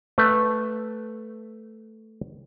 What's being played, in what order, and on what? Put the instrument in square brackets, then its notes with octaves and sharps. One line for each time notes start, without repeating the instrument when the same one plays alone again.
[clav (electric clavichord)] A3 B4